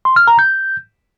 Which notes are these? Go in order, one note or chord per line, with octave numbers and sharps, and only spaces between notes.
C6
F6
A#5
G6